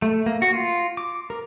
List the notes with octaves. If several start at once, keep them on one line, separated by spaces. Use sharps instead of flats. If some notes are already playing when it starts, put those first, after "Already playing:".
A3
A#3
F#4
F4
D6
A#4